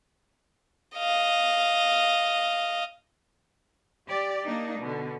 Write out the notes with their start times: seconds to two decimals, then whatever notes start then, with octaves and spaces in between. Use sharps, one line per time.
0.97 D#5 F5
4.08 G4 D5
4.45 A#3 D4 D#4
4.79 B2 D3